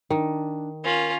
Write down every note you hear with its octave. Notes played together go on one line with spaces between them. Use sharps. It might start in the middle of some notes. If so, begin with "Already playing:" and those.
D#3 D4
C#4 F4 A#4